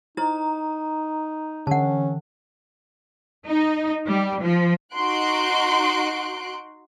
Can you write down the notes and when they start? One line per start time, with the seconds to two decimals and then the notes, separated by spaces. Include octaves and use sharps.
0.17 D#4 E4 C5 A#5
1.67 D3 E3 C#4 F#5 A5
3.47 D#4
4.08 G3
4.43 F3
4.94 D#4 F#4 C6 F#6 D7